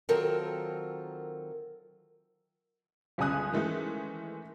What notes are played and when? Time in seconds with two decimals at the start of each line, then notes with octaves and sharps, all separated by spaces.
0.09 D#3 F#3 C4 F4 A4 A#4
3.18 G1 C#2 C#3 G#5 D#6 F#6
3.52 D#3 E3 G#3 A3 C#4